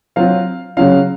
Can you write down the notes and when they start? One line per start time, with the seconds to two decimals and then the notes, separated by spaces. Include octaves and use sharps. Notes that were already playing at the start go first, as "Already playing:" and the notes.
0.16 F#3 C4 F4 F5
0.77 C#3 F#3 C#4 F4 F5